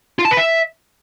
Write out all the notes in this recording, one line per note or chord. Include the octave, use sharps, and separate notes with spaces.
F4
A5
B4
E5